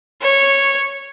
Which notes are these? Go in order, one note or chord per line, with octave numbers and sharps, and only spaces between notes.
C#5